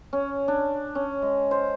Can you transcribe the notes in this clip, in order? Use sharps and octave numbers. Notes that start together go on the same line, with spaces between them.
C#4
D4
C#4
G#3
C5